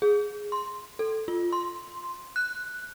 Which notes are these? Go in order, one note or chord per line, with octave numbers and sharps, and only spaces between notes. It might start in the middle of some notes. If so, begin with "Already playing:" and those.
G#4
C6
A4
F4
C6
F#6